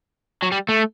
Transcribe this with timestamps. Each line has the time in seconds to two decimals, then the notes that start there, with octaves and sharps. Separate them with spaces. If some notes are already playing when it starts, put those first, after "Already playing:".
0.43 F#3
0.52 G3
0.69 A3